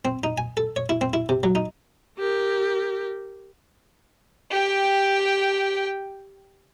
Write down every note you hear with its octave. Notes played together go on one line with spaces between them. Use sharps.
C4
D#4
G#5
A4
C#5
E4
C4
E4
C3
F#3
D#4
G4 A#4
G4 G5